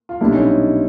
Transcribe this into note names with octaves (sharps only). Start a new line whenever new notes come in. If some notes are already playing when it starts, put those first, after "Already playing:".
F4
B1 A#2 G3 D4 E4
C#4 D#4